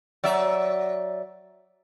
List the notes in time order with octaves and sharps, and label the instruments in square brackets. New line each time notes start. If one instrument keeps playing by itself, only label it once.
[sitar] F#3 D5 E5